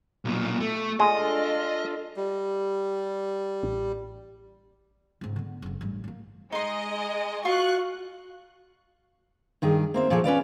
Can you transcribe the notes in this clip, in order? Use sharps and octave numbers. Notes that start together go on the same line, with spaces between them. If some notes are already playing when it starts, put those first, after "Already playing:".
B1 A#2
A3
G#3 D4 F4 A4 D#5
G3
A1
C#2 G#2
D3 B3
F#1 F2
A1 G2
F#3 A#3
G#3 D#4 D#5 C6
F4 F#4 F5 C#6 F#6
G2 D#3 G#4
A#3 C4 E5
A#2 F3 F#4 G#4 A4
C#4 B4 D5 F5